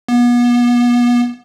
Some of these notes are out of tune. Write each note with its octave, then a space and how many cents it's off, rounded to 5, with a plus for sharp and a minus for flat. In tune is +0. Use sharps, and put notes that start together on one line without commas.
B3 -35